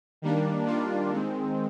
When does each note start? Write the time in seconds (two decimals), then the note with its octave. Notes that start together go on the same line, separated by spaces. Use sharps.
0.22 D#3 G3 A#3 D4
0.66 D#3 G3 A#3 D4 F4
1.10 D#3 G#3 C4